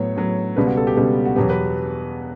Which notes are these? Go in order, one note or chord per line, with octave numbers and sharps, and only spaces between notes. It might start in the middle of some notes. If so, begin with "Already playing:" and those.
Already playing: A2 F#3 B3 C#5
A2 F#3 B3
C#2 B2 G3 B3 B4
F#4
A4
G4
C#2 B2 G3 B3
F#4
E2 B2 F#3 B3 G4
B4